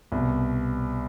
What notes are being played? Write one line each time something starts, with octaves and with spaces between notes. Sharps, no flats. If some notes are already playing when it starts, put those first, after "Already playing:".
C2 B2